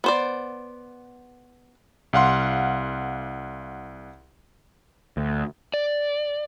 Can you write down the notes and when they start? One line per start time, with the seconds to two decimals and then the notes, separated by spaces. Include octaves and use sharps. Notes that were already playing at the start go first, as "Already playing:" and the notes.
0.04 B3 C5 D5
2.13 C2 F5 F#5 C6
5.17 D2
5.74 D5